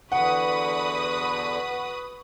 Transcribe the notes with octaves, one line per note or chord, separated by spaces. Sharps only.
E2 D3 F#4 B4 F#5 B5 D#6